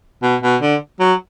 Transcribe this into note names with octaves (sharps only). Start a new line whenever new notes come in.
B2
B2
D3
F#3